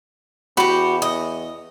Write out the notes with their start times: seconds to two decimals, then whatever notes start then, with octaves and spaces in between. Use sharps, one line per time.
0.57 E2 F#4 G4 B5
1.02 D#5